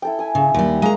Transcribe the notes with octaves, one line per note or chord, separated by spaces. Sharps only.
E4 A4 G5
E5 G#5
C#3
D#2 G3
G#3 A#3 A#5